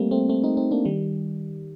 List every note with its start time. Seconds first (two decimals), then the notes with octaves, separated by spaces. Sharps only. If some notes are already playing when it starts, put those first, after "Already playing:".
Already playing: G3 A3 A#3 C4
0.11 A3 C4
0.29 A3 C4
0.44 C4 D#4
0.57 C4 D#4
0.71 A#3 D4
0.85 D#3 G3